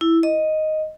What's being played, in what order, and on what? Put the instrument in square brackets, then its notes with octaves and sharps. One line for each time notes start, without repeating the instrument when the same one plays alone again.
[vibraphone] E4
D#5